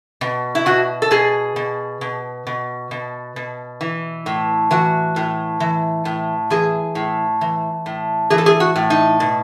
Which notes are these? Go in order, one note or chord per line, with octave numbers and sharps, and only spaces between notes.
B2
E4
B2 F#4
A4
B2 G#4
B2
B2
B2
B2
B2
E3
A2
E3 F#4
A2
E3
A2
E3 G#4
A2
E3
A2
E3 G#4
A4
G#4
F#4
A2
D#4
B2